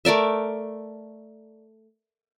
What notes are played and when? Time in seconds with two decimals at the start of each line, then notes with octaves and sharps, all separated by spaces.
0.05 A3 A#4 D5 E5